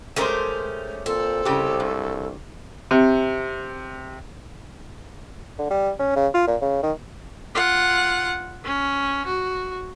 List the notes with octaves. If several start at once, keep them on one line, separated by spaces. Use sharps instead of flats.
G#3 A3 C#4 G4 A#4 C5
A#2 C4 A4
C2 C#3 G4
G2
C3
D3
G3
C#4
C#3
F4
A#2
C#3
D#3
F4 F#5
C#4
F#4